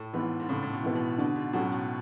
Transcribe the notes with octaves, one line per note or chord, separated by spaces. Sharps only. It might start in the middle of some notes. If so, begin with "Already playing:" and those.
Already playing: A2
G#2 E3 B3
G#2
A2 C#3
A2
B2
E3 B3
B2
B2 D3
G#2
A2 F#3 C#4
B2